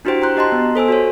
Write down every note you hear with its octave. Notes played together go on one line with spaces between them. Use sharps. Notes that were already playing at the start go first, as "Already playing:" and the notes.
D4 E4 F#4 G4 C5 G5
G5 A#5 C6 F#6 G6
F#4 G4 D#5 A5 A#5 C6
B3
A4 C5 G#5 E6
F#4 A4 C#5